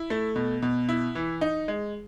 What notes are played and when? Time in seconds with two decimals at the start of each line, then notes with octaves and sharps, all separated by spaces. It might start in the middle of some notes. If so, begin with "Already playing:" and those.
Already playing: E4
0.10 A3
0.36 B2
0.62 B2
0.89 E4
1.15 E3
1.41 D#4
1.68 G#3